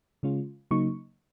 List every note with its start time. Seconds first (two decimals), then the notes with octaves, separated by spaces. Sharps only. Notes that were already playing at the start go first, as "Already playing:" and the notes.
0.23 C#3 G#3 C#4 F4
0.71 C#3 F#3 A#3 D#4 C#6